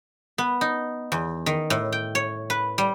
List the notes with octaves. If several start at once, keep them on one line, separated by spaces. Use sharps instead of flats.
B3
D#4
E2
D#3
A2
G5
C#5
B4
G3